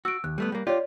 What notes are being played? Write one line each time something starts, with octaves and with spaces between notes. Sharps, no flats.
F#4 E6 D7
D#2 F#6
G3 A3 B3
G3 A#3
F4 G4 C#5 D5